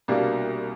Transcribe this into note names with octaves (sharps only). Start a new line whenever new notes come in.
C2 B2 G3 A#3 D4